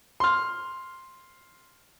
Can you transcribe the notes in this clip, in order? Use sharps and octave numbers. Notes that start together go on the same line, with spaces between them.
C6 F6